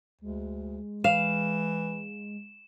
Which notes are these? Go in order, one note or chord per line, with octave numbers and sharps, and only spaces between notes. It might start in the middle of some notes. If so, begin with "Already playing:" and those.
D2 G#3
E3 F5 E7